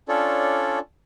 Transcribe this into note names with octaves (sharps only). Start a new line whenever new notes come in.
C#4 D4 F4 A4 C#5 D5